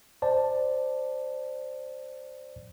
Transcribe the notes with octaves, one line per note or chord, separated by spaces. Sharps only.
C5 D5 A5